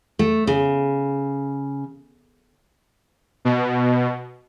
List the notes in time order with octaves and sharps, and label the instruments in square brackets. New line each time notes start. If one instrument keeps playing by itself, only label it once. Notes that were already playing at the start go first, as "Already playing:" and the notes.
[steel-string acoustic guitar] A3
C#3
[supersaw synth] B2